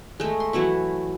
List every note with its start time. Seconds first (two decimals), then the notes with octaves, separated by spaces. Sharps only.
0.20 G#3 A3
0.40 C6
0.53 E3 F#3 E4 C#6